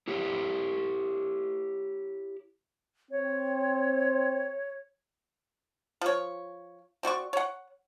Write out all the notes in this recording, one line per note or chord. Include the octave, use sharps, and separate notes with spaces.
E4 G4 C#5 F#5
C4 C#5
F3 C#5
C4 F#4 D5 C#6
C#5 F#5